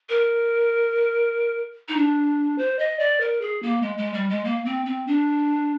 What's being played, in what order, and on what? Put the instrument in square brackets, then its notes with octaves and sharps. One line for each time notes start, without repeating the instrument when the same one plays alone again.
[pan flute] A#4
D#4
D4
C5
D#5
D5
A#4
G#4
A#3
G#3
G#3
G3
G#3
A#3
C4
C4
D4